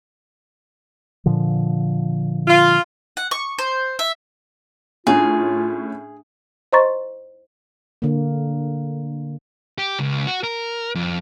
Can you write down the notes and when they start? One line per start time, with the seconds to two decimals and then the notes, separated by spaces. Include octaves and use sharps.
1.26 A#2 D3 F3
2.48 F4
3.17 F#5
3.31 C#6
3.58 C5
3.99 E5
5.07 A2 C#4 D4 F4 G#4 E5
6.73 C5 D#5 A#5 C6 C#6 A6
8.02 D3 A#3
9.78 G4
9.99 C#2
10.27 F#4
10.43 A#4
10.95 F2